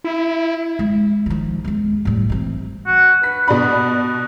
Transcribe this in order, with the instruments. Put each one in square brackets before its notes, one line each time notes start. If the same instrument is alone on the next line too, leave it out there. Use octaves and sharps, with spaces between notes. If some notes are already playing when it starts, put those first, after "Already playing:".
[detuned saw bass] E4
[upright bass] G#3
D#3 F3
E2 G#3
A2 G3
E3 C4
[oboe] F#4
[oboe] B4 [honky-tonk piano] B6
[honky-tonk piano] B2 D5 B5